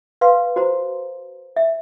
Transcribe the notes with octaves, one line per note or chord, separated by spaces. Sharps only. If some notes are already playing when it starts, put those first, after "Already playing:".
B4 F5 C6
F#4 C5 A#5
E5